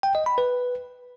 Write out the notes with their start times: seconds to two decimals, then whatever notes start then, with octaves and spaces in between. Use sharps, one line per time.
0.03 G5
0.15 D#5
0.26 B5
0.38 B4